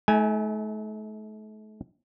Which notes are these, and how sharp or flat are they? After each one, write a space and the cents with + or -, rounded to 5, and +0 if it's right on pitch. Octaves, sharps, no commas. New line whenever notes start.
A3 -40 D#4 +35 G#5 +0